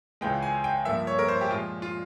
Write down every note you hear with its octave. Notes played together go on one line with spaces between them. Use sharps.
C#2 C#3 E3 G#3 G5
G#5
G5
G2 F3 A#3 E5
C#5
A#4
C5
G4
A#2 F3 G#3 F4
F4